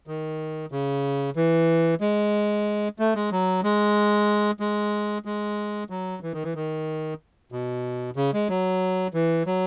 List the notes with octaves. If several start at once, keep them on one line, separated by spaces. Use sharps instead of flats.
D#3
C#3
E3
G#3
A3
G#3
F#3
G#3
G#3
G#3
F#3
E3
D#3
E3
D#3
B2
C#3
G#3
F#3
E3
F#3